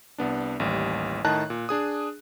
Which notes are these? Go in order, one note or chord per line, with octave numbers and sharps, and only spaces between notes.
C2 B3 D4
A1 D#2 G3
A2 D#3 D#5 A5 A#5 F#6
A#2
D4 G#4 D#6